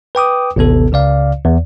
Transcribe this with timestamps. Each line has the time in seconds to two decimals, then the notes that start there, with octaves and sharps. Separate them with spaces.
0.15 B4 G5 D6 D#6
0.56 A1 D#2 C3 B3 A4
0.92 C#2 C#3 D5 F5
1.45 E2